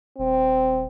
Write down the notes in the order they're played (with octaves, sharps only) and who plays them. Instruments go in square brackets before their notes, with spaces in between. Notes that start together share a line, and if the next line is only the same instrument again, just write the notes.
[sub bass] D#1 [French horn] C4